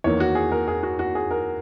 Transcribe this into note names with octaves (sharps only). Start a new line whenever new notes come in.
E2 D#3 A#3 C#5
F#4
G#4
A#4
G#4
F#4
F#4
G#4
A#4